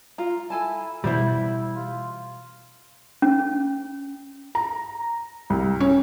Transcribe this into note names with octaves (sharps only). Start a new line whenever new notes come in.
F4 A#5
E4 A4 G#5 A5
B2 E3 G3 E4 C5 E5 F#5
F4
C#4
A#5
C2
C#4